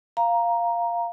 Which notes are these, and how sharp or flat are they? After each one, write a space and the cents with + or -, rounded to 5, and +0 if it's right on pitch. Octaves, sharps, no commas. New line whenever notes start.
F5 -5 A#5 +5